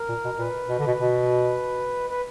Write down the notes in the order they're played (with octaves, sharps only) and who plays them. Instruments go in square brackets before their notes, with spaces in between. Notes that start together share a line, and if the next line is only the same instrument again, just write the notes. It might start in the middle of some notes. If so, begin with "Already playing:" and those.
Already playing: [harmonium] A#4
[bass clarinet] A#2
B2
[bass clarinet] A#2 [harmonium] B4
[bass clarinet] B2
D3
B2
B2
[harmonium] B4